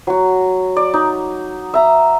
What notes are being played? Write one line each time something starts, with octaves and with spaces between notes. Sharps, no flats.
F#3 F#4
D5
D#4
E5 A#5